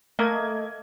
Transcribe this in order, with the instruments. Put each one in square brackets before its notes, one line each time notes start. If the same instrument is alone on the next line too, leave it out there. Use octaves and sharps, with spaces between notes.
[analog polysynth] A3 D#5 G#6 [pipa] A#3